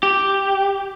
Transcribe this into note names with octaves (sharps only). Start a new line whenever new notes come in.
G4